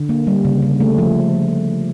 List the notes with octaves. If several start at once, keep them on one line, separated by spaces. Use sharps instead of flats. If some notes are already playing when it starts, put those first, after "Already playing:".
Already playing: D3
A#3
G3
C#3
C#3
A3
F3